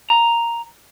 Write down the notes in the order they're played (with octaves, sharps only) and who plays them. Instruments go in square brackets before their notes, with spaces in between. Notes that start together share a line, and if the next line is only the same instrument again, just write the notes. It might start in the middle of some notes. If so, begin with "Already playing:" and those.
[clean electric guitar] A#5